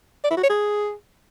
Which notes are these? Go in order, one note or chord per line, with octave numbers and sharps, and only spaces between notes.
D5
E4
F#4
C#5
G#4